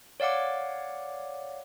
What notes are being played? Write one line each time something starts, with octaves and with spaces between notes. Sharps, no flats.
C#5 D5 F5 F#5 D6